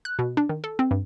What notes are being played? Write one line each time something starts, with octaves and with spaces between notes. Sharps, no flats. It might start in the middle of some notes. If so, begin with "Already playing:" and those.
F#6
B2
D4
D#3
A4
C4
G2